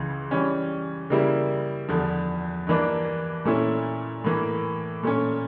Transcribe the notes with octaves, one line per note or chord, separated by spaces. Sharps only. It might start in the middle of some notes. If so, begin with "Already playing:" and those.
Already playing: C#2 C#3 E3
E3 G3 C#4
C#3 G3 A#3 E4
E2 D3 F3
G2 E3 A#3 D4
A#2 A3 C#4 E4
A2 E3 A#3
A#2 A3 C#4